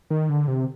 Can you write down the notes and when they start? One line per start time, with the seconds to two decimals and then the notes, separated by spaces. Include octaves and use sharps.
0.10 D#3
0.29 D3
0.48 C3